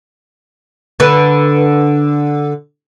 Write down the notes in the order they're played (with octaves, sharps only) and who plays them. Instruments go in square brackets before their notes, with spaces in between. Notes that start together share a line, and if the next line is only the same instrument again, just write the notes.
[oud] D3 B4